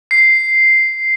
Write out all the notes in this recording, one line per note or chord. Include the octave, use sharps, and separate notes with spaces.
C7